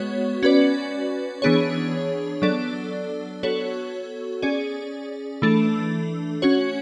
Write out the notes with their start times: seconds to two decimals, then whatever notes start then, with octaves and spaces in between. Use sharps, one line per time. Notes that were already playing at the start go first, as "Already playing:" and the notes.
Already playing: G#3 B3 F#4 C#5
0.43 C#4 F#4 B4 D5
1.42 E3 B3 D4 G#4 C#5
2.42 F#3 B3 D4 A4 D5
3.43 B3 F#4 A4 C#5
4.42 C#4 G#4 D5
5.42 E3 A3 D4 A4
6.42 C#4 F#4 C#5